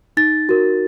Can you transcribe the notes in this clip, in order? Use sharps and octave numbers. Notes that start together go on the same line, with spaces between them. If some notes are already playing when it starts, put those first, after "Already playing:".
D#4 A6
F#4 A#4